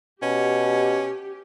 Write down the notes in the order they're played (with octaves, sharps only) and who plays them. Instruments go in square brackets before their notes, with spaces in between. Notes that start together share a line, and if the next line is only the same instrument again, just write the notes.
[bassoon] B2 [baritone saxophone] C#4 [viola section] G4